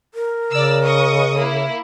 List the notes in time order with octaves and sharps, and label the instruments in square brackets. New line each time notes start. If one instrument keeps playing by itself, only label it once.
[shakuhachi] A#4
[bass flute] C#3 [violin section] D5 E6
[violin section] D#5 C#6 D#6
A#3 E4